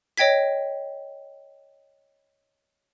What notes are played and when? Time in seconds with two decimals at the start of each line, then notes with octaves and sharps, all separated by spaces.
0.17 C#5 D#5 G5 G#6 B6